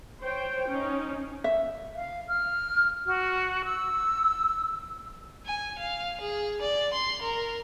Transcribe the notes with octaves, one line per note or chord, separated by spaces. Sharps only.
C5 C#5 G5
C#4 D#4
E5
F5
F6
F#4
E6
G#5
F5
G#4
D5
C6
A#4